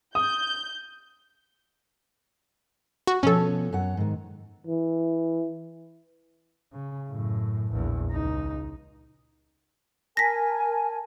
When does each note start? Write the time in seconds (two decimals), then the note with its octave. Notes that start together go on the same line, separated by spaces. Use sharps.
0.15 D#6 G6
3.07 F#4
3.23 B2 F3 C#4 A4 C#5
3.73 F#2 C#5 F#5
3.97 G#2 D#3
4.67 E3
6.73 C#3
7.09 F#2 A2
7.71 A#1 E2
8.11 C#2 D#4
10.17 A#4 G#5 A5 A#6 B6